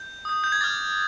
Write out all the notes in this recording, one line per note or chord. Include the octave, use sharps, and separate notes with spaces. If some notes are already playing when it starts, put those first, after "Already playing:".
Already playing: G6
D#6 G6
G6
G#6
D6 F6 A6